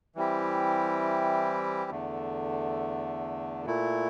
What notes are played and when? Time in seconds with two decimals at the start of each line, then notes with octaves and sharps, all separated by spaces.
0.15 E3 G3 C4 E4 G4
1.91 E2 D3 A3
3.65 A#2 A3 E4